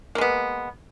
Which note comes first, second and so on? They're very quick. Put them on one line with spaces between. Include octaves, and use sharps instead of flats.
A#3 G#3 B3